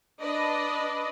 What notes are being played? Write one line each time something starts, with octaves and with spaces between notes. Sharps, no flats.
D4 B4 D5 D#5